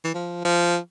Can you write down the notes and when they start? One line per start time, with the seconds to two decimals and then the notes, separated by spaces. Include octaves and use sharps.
0.04 E3
0.15 F3
0.45 F3